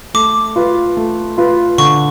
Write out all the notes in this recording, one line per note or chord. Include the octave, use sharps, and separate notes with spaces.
A3 D6
F4 B4
A3
F4 B4
D3 C#6